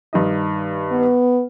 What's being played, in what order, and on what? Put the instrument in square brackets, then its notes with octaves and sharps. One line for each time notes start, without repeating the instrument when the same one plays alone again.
[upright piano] G2 D#3 D#5
[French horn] B3